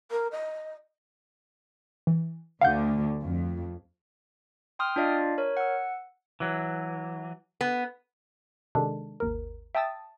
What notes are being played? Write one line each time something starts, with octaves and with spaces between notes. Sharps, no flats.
A#4
D#5
E3
D2 D3 F5 F#5 G6
F2
G5 C6 D#6 F6
D4 F4 D5 D#5 F5
A#4 C#5
F#5 E6
E3 F#3
B3
C3 D#3 G#3 D4 A4
G#1 D#2 A#4
E5 G5 A5 D#6 E6 A6